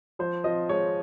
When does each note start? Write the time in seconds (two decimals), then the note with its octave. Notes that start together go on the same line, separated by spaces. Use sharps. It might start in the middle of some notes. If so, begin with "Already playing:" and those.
0.19 F3 C5
0.44 F3 D#5
0.69 G#3 C#5